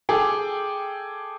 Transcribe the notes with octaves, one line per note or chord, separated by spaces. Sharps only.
G#4 A4 G5 D6